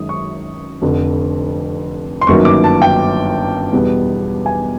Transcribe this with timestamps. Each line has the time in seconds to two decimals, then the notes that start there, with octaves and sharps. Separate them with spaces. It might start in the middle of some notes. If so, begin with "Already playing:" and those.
Already playing: F#2 D#3 G#3 D#6
0.09 C#6
0.82 F1 F2 D3
2.21 C6
2.27 G1 F#2 D#3 F#3 A#3 C#6
2.45 D6
2.64 A5
2.82 G5
3.72 E2 B2 G3 B3
4.46 G#5